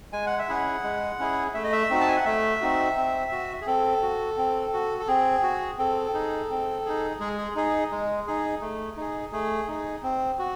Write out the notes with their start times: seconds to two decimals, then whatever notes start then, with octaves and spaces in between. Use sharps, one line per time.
0.12 G#3 G#5
0.26 F#5
0.39 E5
0.49 C#4 E4 G#4 F#5
0.83 G#3
1.19 C#4 E4 G#4
1.54 A3 E5
1.64 D#5
1.72 E5
1.90 C4 D#4 F#4
2.01 A5
2.08 G#5
2.17 F#5
2.25 A3 E5
2.61 C4 D#4 F#4
2.96 C4
3.31 F#4
3.61 G#4
3.66 C4 A4
4.02 F#4
4.37 C4
4.73 F#4
5.00 A4
5.07 C4 G#4
5.43 F#4
5.78 C4 A4
6.14 D#4 G#4
6.50 C4
6.85 D#4 G#4
7.20 G#3 G#4
7.38 G#4
7.55 D#4 G#4
7.91 G#3
8.27 D#4 G#4
8.61 A3
8.97 D#4 G#4
9.32 A3 G#4
9.68 D#4 G#4
10.03 C4
10.39 F#4